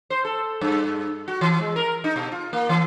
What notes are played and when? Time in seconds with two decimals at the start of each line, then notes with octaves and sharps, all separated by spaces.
0.10 C5
0.25 A4
0.61 G2
1.28 F#4
1.41 E3
1.60 G#3
1.76 A#4
2.04 D#4
2.16 B2
2.32 F4
2.53 A#3
2.69 E3